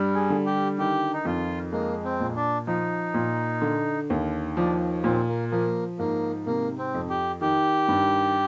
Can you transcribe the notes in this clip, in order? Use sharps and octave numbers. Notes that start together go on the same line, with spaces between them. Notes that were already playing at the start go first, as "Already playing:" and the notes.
Already playing: G2 G3
G#4
D3
G4
D#3 G4
D#4
F2 F4
G#3 A#3
C4
A#2
D4
F3 D#4
A#2
D3
D#2
F3 D4
A#2 C4
A#3
F3 A#3
G#2 A#3
C3 A#3
C4
F2
G4
D#3 G4
G2